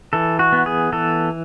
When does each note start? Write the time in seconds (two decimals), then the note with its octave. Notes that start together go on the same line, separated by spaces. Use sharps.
0.13 E3 A4
0.39 F#4
0.52 B3
0.66 G#4
0.92 E3 A4